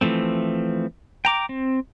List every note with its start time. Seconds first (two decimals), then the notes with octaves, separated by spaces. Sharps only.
0.01 E3 F3 A3 C4
1.25 G5 A#5 D6
1.49 C4